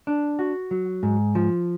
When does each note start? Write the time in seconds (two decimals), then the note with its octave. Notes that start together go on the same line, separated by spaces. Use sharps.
0.07 D4
0.39 F#4
0.71 F#3
1.03 G#2
1.35 F3